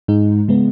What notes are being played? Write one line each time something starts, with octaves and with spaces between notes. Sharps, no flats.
G#2 G#3 D#4
C#3 G#3 B3